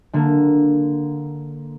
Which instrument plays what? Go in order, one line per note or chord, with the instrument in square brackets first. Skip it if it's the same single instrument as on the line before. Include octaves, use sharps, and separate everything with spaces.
[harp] D3 A#3